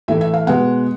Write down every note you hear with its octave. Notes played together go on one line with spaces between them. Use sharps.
A2 E3 A3 E5
E5
F5
B2 G#3 B3 F#5